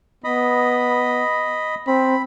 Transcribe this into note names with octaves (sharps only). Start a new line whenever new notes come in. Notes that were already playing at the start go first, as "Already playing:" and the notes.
B3 D#5 B5
C4 B5